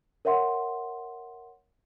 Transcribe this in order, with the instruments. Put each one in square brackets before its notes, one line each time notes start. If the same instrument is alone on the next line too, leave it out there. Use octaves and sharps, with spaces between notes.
[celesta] A#4 C#5 E5 F#5 C6